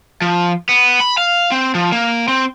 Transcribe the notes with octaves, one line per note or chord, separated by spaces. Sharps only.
F3
B3
B5
F5
C4
F3
A#3
C4